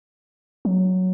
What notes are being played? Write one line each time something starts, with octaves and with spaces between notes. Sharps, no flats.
F#3